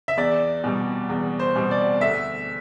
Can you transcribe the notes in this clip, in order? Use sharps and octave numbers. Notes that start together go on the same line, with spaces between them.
E5
E2 D5
B2 G3
E2
C5
B2 G3
D5
D2 E5